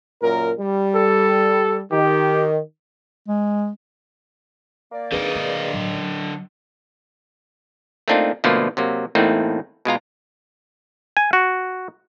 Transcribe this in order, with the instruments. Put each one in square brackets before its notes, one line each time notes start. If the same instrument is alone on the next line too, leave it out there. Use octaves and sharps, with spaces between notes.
[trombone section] F#2 A#2 A#4
G3
[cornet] A4
[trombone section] D#3 [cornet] G4
[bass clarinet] G#3
[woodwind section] A#3 D5
[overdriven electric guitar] D3 D#5 [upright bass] C4 D#4 [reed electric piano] G#4 B4
[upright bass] C#3 D4
[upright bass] A2 E3 [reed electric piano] F#3
[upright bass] C#4
[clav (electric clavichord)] A3 A#3 C4 D4 D#4 F4
B2 D3 F3 A3 A#3 F4
C3 F#3 A#3
E2 A2 A3 A#3 C4 D#4
B2 G#3 F4 A#5
G#5
F#4